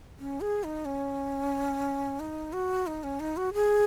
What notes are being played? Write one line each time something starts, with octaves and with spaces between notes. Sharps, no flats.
C#4
G#4
D#4
C#4
D#4
F#4
D#4
C#4
D#4
F#4
G#4